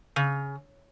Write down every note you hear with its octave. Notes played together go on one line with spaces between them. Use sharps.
C#3